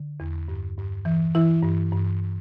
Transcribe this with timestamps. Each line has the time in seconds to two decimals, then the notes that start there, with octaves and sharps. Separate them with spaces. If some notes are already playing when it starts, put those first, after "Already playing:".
Already playing: D3
0.20 E2
0.48 G2
0.77 G2
1.05 E3
1.35 E3 E4
1.63 G2
1.92 G2